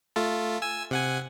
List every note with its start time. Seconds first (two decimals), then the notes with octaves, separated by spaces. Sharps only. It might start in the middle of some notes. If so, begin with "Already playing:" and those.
0.16 A3 F4 A4
0.62 G#5 E6
0.91 C3 F#5 G#5